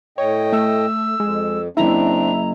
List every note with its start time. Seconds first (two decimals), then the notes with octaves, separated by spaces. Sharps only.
0.18 A2 C#5 D#5 G5
0.52 A3 E6
1.20 F2 G#3
1.77 F#1 C4 D4 E4 E5 A#5